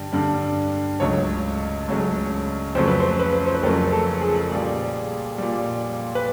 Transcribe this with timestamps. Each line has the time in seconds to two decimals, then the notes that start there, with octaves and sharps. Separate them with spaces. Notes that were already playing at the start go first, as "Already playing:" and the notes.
Already playing: G2 D3 G3
0.13 G2 D3 G3
1.00 C#2 C#3 F#3 A3 C#5
1.88 C#2 C#3 F#3 A3
2.75 F2 C#3 F#3 A3 C5
2.88 B4
3.00 C5
3.19 B4
3.47 C5
3.55 B4
3.63 F2 C#3 F#3 A3 A#4
3.92 A4
4.21 G#4
4.51 A#2 G3
5.38 A#2 G3
6.15 B4